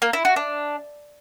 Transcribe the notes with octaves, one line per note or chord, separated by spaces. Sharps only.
A#3
E4
F#4
D4